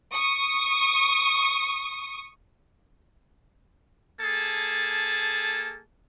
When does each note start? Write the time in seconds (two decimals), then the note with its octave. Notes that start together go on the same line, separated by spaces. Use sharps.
0.11 C#6 D#6
4.20 A#3 G#4 A4 A5